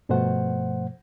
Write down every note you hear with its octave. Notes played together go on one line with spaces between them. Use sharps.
G2 B2 F3 A3 C5 F#5